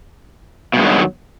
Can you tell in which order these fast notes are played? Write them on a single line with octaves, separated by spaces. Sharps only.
B2 G2 G#3 D#3 F#3